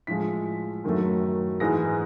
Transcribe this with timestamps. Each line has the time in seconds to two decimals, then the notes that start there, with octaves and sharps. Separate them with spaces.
0.07 A2 F3 G#3 B6
0.84 F#2 D#3 F#3 A3
1.60 G#2 E3 G#3 A#6